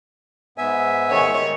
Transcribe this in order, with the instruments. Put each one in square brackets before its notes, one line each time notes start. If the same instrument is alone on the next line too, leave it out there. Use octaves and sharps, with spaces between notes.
[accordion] G#2 B3 G#5 [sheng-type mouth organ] E5
[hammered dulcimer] D#3 G#3 [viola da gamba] C#5